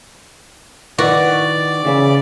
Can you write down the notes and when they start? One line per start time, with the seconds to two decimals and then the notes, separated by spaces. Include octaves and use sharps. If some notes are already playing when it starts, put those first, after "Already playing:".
0.98 D#3 E4 F#4 B4 D5
1.84 C#3 E3 E5